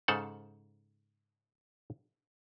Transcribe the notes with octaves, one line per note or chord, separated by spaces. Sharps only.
G#2 C#3 A4 C5 F5 F#5